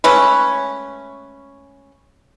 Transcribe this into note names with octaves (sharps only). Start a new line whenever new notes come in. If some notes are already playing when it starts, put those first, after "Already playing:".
G#3 A3 C#4 B4